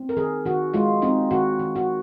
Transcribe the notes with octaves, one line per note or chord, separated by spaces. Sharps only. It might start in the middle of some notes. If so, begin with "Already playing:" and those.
Already playing: C4
A#4
D#3 G#4
D#3 F#4
G#3 F4
C4 D#4
D#3 F#4
D#3
F#4